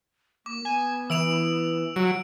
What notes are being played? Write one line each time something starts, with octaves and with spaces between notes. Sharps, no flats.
A#3 D6
B3 G#5
E3 E6 D7 F7
F#3 D7